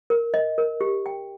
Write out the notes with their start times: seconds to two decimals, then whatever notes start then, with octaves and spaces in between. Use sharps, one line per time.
0.10 A#4
0.34 D#5
0.58 A#4
0.81 G4
1.06 G5